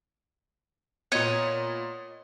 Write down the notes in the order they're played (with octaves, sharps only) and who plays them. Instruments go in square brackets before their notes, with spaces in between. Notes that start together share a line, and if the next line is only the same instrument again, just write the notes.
[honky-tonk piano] A#2 B3 [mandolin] C#5 D#5